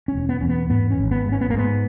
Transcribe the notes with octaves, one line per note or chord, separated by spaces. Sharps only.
C#4
E1
B3
E2 C#4
B3
G#2 B3
C#4
G#1
B3
G#2
C#4
B3
A#3
G#2 B3